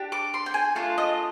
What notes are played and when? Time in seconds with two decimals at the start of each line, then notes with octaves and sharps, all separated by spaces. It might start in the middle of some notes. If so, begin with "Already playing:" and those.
Already playing: D4 G4
0.12 D6
0.34 C6
0.46 G5
0.54 G#5
0.76 A3 D4 F4
0.98 D#5